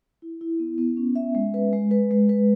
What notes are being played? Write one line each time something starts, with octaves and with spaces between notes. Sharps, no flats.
E4
E4
B3
B3
C#4
E5
G#3
B4
G#3
B4
G#3
B4